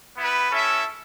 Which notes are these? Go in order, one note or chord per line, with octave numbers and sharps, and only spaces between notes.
B3 E4 B4
C#4 E4 A4 E5